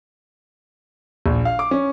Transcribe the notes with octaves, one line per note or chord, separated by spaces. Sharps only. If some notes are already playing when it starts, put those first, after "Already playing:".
A#1
F5
D6
C#4